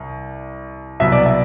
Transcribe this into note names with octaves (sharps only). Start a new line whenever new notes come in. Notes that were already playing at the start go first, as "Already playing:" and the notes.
Already playing: C2
C2 B2 F#3 E5
D5
E5